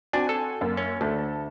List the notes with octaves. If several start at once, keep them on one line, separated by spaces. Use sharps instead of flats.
C4 D4 F#4 G#5
A4
F#2 A#3
C#4
D2 A4